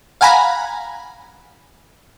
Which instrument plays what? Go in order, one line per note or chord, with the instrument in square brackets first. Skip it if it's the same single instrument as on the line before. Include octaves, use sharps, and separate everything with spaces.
[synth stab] F5 F#5 G#5 A#5 B5